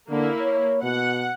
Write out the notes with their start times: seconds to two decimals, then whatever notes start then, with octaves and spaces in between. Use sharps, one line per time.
0.10 D3 A#3 E4
0.41 C#5
0.84 B2 F#5